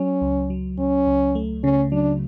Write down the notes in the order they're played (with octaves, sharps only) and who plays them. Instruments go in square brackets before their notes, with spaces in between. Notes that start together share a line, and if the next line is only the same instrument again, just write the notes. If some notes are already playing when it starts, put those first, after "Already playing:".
Already playing: [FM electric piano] F#3 [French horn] C#4
[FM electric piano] C#2
F#3
[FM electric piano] C#2 [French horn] C#4
[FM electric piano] C#2
A3
[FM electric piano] C#3 [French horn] C#4
[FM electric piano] F#3 [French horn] D4